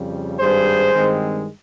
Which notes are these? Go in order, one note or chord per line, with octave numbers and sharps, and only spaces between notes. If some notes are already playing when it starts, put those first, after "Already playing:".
Already playing: F2 C#3 G3
G#1 G2 G3 G#4 C5
G2 D#3 G#3 C4